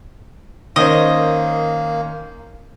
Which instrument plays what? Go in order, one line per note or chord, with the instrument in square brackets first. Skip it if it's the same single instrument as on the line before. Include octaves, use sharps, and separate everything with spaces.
[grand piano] D#3 C#4 C5 [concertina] A#3 [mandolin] D#5